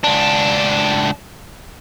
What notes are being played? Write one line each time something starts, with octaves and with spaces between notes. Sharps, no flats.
C#2 D4